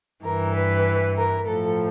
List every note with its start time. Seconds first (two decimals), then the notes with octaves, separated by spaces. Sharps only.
0.24 G2 E3 A#4
0.55 B4
1.17 A#4
1.48 A2 F3 A4